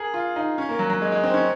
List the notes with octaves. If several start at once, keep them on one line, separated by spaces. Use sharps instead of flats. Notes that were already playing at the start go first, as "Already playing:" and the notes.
Already playing: G#4 A#4
F4
D#4
C#4
A#3
F#3
F#3
G#3
G#3
C4
C#4